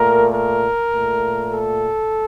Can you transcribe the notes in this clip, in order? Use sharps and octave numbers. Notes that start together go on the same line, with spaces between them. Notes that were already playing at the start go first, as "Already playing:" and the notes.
Already playing: A#2 A3 A#4
A#4
A#2 A3
A4